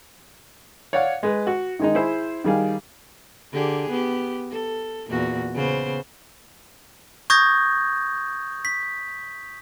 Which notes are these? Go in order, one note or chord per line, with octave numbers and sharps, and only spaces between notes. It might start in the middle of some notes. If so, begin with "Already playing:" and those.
C#5 D5 F5 F#5
G#3 B4
F#4
D#3 G#3 D#4
E4 G#4 C5
D#3 G3 G#4 F5
D3 G4 G#4
B3 G4
A4
E2 A#2 F#4
C#3 B3 C5
C#6 D#6 G6 G#6 A#6
B6